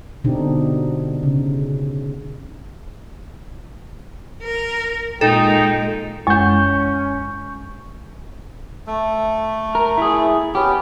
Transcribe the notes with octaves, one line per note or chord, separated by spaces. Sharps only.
B2 D3 C4 D4 D#4 G4
C#3
A#4
A#2 G#3 D#4 A4 G5
F#2 G#3 C#4 C#6 G6
A3
A#4
E4 G#4
B3 C#4 G4